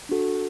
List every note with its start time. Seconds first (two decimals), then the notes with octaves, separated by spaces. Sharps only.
0.09 D4 F#4 A4